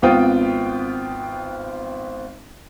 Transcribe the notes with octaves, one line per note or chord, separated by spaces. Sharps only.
G#1 B3 C4 F4 G5 D#6